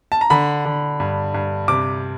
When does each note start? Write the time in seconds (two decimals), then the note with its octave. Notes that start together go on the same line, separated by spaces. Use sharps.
0.12 A5
0.21 A#5
0.30 D3 B5
0.65 D3
1.00 G2
1.34 G2
1.68 C3 D6